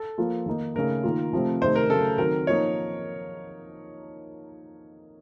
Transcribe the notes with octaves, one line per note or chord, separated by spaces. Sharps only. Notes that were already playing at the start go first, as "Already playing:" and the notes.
Already playing: A4
F3 A#3 F4
D#3 A#3 D#4
C#3 A3 D#4 A#4
D#3 A#3 F4
C3 F3 A3 C4
C3 D#3 A3 D#4 C5
A#4
C#3 F#3 A3 A4
D#3 F#3 C4 A#4
F3 A#3 D#4 C#5